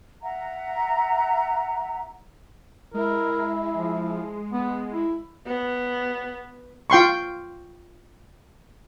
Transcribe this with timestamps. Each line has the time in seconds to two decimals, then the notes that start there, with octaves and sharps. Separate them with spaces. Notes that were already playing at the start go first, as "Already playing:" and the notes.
0.22 E5 F#5 A#5
2.94 G#3 E4 A#4
3.76 F3
4.52 B3
4.92 E4
5.47 B3
6.90 F4 G5 C6 C#6